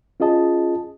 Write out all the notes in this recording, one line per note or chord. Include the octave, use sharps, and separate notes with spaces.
C#4 F4 G#4 D#5 A5